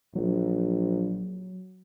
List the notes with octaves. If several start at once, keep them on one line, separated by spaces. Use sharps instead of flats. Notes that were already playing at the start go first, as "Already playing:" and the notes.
A#1 F#3